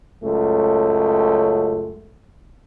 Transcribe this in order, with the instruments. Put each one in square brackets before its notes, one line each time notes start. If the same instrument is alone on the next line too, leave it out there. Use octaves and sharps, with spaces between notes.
[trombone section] C#2 F#2 A3